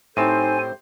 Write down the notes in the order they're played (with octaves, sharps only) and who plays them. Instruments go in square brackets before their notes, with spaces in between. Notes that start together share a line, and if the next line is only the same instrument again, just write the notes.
[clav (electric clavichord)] A2 C4 A5 [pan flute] D#4 [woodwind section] G4 A4 C5 [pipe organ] G#5